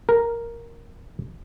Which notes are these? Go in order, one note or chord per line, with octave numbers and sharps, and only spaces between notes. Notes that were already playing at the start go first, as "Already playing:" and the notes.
A#4